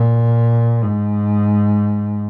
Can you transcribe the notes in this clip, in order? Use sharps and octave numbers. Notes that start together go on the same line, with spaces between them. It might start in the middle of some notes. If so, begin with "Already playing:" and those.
Already playing: A#2
G#2